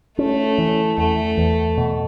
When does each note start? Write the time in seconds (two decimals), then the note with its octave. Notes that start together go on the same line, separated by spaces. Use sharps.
0.18 A3 C#4
0.58 E3
0.98 E2 A3
1.38 E2
1.78 B2